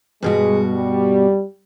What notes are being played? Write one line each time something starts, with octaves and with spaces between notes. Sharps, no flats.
G2 B2 G#3 F#4 G#4
G3